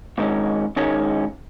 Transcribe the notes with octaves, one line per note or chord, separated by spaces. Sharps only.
G#2 D#3 G#3 C#4
G#2 D#3 G#3 C#4